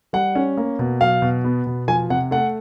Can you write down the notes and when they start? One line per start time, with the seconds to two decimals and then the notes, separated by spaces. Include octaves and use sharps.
0.13 G3 F#5
0.35 C#4
0.57 A#3
0.79 B2
1.01 F#3 F5
1.22 B2
1.44 B3
1.67 B2
1.88 F3 G#5
2.10 C3 F#5
2.31 A3 F#5